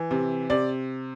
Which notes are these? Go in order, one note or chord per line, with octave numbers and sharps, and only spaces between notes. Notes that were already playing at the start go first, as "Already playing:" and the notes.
Already playing: E3
C3
C3 D5